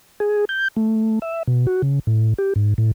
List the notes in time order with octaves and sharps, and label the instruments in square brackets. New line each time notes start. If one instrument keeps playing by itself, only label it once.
[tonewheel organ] G#4
G6
A3
E5
B2
F#4
C#3
A2
G4
G#2
A2